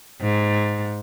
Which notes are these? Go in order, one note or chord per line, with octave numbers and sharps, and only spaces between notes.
G#2